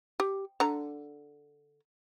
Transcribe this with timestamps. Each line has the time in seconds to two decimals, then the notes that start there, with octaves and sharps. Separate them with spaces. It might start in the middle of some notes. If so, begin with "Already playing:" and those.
0.20 G4
0.60 D3 A#5